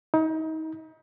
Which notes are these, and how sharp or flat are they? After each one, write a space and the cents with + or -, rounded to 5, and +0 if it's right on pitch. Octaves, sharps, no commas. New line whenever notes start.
D#4 +30